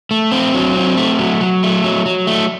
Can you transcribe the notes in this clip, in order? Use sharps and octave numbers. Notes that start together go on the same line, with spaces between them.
A3
C4
F#3
C4
A3
F#3
F#3
A3
F#3
F#3
A3